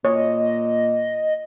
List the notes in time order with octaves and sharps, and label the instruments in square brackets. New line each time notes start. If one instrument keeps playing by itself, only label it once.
[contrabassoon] A#2 [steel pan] C#5 [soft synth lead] D#5